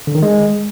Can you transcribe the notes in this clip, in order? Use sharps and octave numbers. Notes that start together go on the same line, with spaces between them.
D3
D#3
G#3